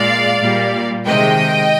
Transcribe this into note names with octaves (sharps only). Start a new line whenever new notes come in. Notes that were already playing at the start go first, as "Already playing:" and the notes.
Already playing: A#2 G#3 D5 F5
A#2 G3
C3 D#3 G#3 D#5 G5